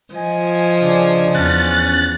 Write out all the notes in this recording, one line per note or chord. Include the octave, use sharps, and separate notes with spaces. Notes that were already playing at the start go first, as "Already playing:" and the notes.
F3 D#5 G#5
C#3 D4
E2 C#4 F#6 A6